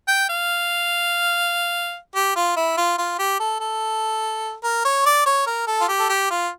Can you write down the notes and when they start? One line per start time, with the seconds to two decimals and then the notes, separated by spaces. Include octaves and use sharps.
0.08 G5
0.29 F5
2.15 G4
2.36 F4
2.56 E4
2.77 F4
2.98 F4
3.19 G4
3.40 A4
3.60 A4
4.64 A#4
4.85 C#5
5.06 D5
5.26 C#5
5.47 A#4
5.68 A4
5.81 F4
5.88 G4
6.00 A4
6.09 G4
6.30 F4